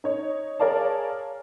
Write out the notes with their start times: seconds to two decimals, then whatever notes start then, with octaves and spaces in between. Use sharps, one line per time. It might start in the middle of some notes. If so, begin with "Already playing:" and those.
0.04 D#4 C#5
0.59 G#4 A#4 C#5 D5 F5 A5